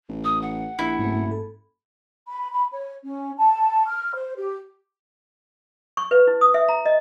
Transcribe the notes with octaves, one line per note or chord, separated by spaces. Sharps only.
A1
D#6
F#5
A#1 E4
F#1 G#2 A3 C4
G#2 A4
B5
B5
C#5
C#4
A5
F6
C5
G4
C#6
B4
E4
D#6
E5
A#5
D#5